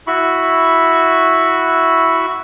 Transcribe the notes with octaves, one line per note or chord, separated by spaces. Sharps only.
E4 F#4 B5 C#6